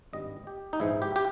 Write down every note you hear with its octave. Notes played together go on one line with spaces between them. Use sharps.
G#1 G2 G3 D#5
G4
D#4
A#1 G#2 E3 G#3 E4
G4
G4